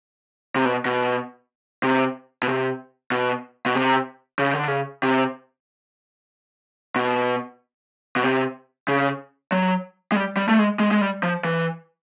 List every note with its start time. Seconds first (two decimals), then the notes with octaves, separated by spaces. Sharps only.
0.56 C3
0.65 B2
0.85 B2
1.83 C3
2.43 B2
2.48 C3
3.12 B2
3.66 B2
3.75 C3
4.39 C#3
4.53 D3
4.67 C#3
5.03 C3
6.96 B2
8.16 B2
8.24 C3
8.88 C#3
9.52 F#3
10.12 G#3
10.16 G3
10.37 G3
10.49 A3
10.59 G#3
10.80 G#3
10.91 G#3
11.01 G3
11.23 F3
11.44 E3